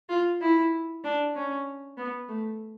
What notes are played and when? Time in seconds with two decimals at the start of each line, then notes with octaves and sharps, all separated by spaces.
0.09 F4
0.41 E4
1.04 D4
1.35 C#4
1.98 B3
2.28 A3